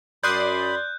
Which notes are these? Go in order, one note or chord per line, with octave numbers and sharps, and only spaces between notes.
F#2 D5 B5 C6 D#6 F#6 G6